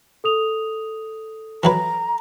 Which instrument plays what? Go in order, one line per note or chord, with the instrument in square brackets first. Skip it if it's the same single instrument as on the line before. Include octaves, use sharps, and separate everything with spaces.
[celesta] A4 D#6 F7
[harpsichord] E3 F#3 B4 [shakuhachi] A#5